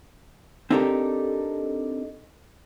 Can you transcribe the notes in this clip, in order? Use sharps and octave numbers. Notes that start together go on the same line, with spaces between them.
C4 D4 D#4 G4 A4 A#4